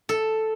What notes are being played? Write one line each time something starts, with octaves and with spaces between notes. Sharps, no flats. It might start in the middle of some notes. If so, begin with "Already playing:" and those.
A4